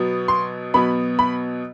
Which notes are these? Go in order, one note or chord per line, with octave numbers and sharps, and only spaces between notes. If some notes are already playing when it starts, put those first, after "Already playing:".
Already playing: B2 F#3 B3
C6
B2 F#3 B3 B5
B5